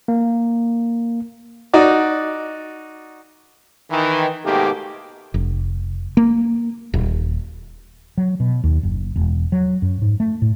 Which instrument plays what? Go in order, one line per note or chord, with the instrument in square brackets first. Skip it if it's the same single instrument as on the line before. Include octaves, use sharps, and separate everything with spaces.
[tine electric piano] A#3
[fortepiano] D#4 F#4 D5
[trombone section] D#3 E3
G#2 B2 D#3 A3 A#3 G4
[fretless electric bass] F1
A#3
D#1
F#3
B2
D#2
F#1
E1
F#3
F#2
G#2
A3
A2